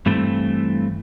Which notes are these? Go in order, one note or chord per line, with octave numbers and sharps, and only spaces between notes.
G2 E3 A3 C4